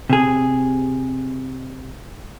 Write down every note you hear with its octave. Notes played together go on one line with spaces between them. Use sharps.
C3 G#4